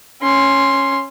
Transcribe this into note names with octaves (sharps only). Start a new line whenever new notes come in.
C#4 C6